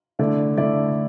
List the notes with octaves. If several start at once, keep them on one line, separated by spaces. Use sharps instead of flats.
D3 A3 E4 D5
D3 A3 E4 D5